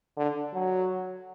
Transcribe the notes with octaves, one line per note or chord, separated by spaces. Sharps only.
D3
F#3